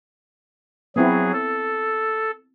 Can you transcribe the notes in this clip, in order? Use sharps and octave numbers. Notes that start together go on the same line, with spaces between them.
F#3 B3 C4 E4 G#4
A4